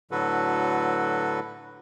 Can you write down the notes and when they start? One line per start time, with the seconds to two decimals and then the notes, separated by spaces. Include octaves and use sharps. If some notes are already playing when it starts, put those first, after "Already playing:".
0.11 A2 D3 F#3 F#4 A4 B4